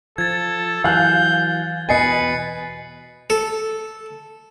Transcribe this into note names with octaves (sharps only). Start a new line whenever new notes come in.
F3 A4 G#6 A6
E3 F#3 F5 G#5 F#6 G6
E2 B2 B4 D#5 G#5 A6 C7 C#7
A4